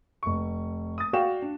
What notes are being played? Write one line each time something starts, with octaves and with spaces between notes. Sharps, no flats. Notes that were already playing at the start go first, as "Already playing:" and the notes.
F1 C#6
D#6 A6
F#4 D5 F5 G5 E7
D4